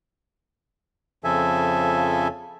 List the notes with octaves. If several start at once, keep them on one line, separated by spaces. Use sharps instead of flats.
F2 C#3 F3 A4 E5 G#5